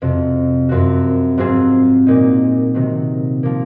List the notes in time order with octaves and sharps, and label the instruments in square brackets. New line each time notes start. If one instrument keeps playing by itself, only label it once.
[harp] F2 C3 F#3
F#2 F3 C4 F#4
G#2 F#3 C4 F4 G#4
A#2 F#3 A#3 D#4
C3 D#3 F#3
F3 A#3